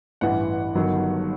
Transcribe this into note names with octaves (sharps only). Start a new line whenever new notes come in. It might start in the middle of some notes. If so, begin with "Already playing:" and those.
A1 G2 E3 F#5
G1 G2 D#3 F#3